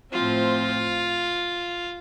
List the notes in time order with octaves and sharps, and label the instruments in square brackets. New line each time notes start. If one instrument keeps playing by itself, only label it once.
[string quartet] A2 F3 C4 [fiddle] F4